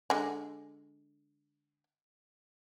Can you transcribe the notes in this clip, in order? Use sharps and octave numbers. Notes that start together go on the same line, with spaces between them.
D3 G#3